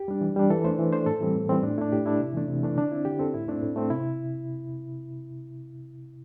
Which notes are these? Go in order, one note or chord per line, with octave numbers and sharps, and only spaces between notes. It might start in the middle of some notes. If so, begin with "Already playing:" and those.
Already playing: G4
G3 D4
E3
G3 D4
E3 A4
A3 D4 C5
E3
A3 D4 C5
A2 A4
E3 G3 C4
A2
E3 G3 C4
A2 D4
A3 D4 E4
A2 G4
A3 D4 E4
C3
E3 A3 D4
C3
E3 A3 D4
D3 D4
C4 E4
D3 G4
C4 A4
A2 E4
A3 C4 D4
A2
A3 C4
C3 E4